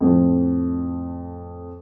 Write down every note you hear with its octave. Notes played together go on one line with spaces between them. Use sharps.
F2 A2 F3